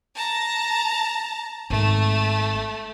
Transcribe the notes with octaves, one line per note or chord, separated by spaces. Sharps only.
A5 A#5
G#1 A3